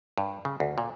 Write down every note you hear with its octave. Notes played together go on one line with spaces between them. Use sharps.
G2
C#3
D2
A#2